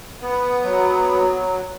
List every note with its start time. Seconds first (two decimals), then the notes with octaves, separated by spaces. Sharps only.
0.21 B3
0.63 F#3